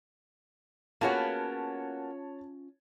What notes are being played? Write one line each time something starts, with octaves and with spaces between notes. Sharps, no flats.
A#3 B3 C#4 F4 F#4 G#4 C#5 A5